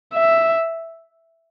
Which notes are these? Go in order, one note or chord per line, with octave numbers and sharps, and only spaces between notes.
E5